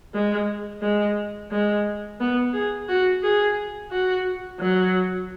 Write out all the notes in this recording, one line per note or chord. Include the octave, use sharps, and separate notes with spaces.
G#3
G#3
G#3
B3
G#4
F#4
G#4
F#4
F#3